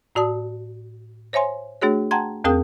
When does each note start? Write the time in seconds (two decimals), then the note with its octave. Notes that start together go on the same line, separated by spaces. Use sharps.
0.15 A2 F#4 D5 A5 D#6
1.33 C5 C#5 E5 G#5 C6
1.82 A3 D4 F#4 G#4 C#5
2.11 F#5 G5 A5 A#5 C6 G#6
2.44 E2 C4 G#4 A#4 G5 D#6